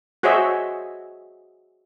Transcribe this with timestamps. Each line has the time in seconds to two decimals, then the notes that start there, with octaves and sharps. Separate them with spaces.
0.23 F#4 G#4 C5 C#5 D#5 E5